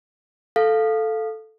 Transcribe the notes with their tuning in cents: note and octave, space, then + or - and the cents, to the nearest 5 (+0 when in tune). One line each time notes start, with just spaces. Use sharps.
A4 +0 F5 +0